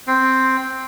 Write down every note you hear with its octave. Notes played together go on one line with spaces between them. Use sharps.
C4